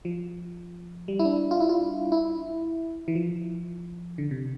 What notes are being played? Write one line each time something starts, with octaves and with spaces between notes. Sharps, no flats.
F3
G3
E4
D4
F4
E4
F4
E4
E3
F3
D3
C3